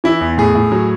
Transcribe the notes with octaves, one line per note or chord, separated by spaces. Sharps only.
E3 E4
E2
A2 G#4
A2
F#3